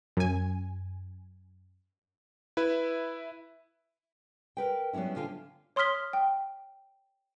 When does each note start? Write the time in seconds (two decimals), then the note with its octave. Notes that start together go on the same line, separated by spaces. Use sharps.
0.17 F#2 G#5
2.57 E4 B4 E5
4.57 A#4 B4 G5
4.93 F#3 G3 B3 C#4 E4
5.16 D3 C#4 F4 F5 G5 G#5
5.76 C#5 C6 D#6 F6 B6 G7
6.13 G5